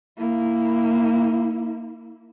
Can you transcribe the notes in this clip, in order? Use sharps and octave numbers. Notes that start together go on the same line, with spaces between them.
A#3 E4